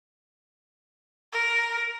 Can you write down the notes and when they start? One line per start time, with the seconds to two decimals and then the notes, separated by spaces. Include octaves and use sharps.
1.32 A#4